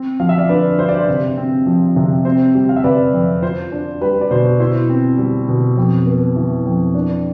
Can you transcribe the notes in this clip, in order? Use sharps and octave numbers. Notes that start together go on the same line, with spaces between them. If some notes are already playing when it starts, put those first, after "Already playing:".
Already playing: C4
F3 F5
E5
D5 F5
D3 B4 D5
G2 C5
D5
C5
C3
C4
F3
C3
C4 C5
G3
F5
E5
C3 B4 D5
F2
F4 C5
D4
G3 B4
D5
B2 C5
E4 C5
C4
G3
B2
F2
B3
E3
F2
D4